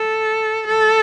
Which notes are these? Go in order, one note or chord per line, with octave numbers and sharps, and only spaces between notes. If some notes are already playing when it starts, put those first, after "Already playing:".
Already playing: A4
A4